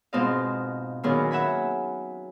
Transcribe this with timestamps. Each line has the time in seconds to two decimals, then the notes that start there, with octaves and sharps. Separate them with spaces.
0.13 G#2 B2 C4 F4 D#5 F5
1.03 A#2 D#3 F#3 B3 C#4 G#4
1.31 E5 F#5 G#5 B5